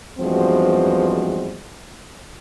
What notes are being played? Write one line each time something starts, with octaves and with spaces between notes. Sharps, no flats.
E2 G2 F3 G#3 C4 F#4